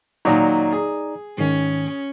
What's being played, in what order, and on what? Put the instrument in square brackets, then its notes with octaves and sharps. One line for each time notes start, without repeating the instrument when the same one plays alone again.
[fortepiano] A#2 D#3 F#3 [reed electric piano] D#4 D5 A#5
[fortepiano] G#4
[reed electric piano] G#2 D#3 [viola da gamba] C#4